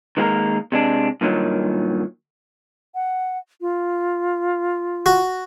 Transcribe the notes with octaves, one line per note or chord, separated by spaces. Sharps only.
D#3 G#3 A#3 A4 A#4
C3 G#3 D4
G2 A#2 D#3 F3 F#3
F#5
F4
F#4